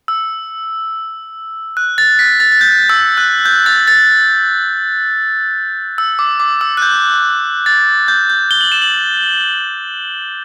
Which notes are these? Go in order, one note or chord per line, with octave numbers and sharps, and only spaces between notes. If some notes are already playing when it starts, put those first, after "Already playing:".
E6
F#6
A6
B6
A6
A6
G6
E6
F#6
G6
A6
A6
E6
D6
D6
E6
F#6
G6
A6
G6
G6
G7
F#7
E7
F#7